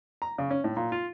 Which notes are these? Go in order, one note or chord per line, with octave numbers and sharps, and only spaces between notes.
A#5
C#3
C#4
A2
A#2
F4